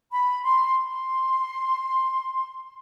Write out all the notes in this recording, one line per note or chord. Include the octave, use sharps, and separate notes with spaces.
B5
C6
C6